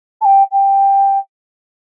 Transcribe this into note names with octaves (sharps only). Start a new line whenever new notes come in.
A5
G5
G5